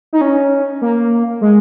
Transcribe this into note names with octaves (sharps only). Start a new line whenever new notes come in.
D#4
C#4
A#3
G#3